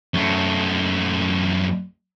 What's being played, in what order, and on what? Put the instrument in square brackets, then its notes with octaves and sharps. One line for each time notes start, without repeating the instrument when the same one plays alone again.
[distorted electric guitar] F#2 A3